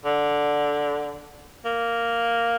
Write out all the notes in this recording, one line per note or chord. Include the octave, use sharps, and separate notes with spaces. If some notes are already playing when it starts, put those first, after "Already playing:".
D3
A#3